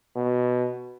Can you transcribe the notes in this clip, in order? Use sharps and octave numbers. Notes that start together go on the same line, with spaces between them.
B2